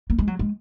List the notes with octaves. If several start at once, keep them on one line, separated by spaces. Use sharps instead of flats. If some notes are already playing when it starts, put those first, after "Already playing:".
A#3
G#3
F#3
G#3